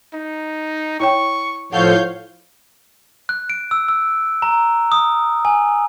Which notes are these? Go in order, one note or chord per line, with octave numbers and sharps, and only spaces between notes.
D#4
E4 C#5 G5 C#6
A2 F3 A4 C#5 F5 F#5 C#6 G6
F#6
D7
E6
E6
A#5
D#6
G#5